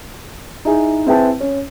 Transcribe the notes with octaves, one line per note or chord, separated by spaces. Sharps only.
D#4 E4 G#4
C4 E4 G#4 B4 G5 A5
C#4